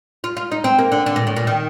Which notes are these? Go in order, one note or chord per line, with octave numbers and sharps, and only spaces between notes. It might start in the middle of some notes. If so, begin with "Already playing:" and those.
F4
F4
D#4
C4
A#3
D3
D3
A#2
A2
A#2
D#3